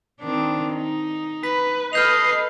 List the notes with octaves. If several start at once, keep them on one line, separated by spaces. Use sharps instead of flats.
D#3 C4 D4
D#4
B4 B6
A4 B4 D#5 F6 G6 C7 F7